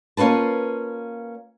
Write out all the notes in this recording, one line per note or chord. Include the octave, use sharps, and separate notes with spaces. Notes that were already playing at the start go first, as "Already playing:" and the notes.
A#3 C#4 F4 B4 A5